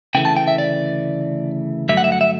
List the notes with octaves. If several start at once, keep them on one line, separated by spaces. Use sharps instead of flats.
D2 C#3 E3 A3 G5
A5
G5
E5
D5
G2 D3 F#3 A3 E5
F#5
E5
F#5
E5